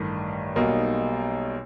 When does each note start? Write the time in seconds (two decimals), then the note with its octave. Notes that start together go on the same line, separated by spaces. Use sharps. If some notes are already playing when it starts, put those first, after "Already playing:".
Already playing: A1 G2 D#3
0.56 B1 B2 G3 A#3 D#4